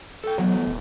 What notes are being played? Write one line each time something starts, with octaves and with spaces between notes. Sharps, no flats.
A4 G5
E3 F#3 A3 B3
F#3
D#1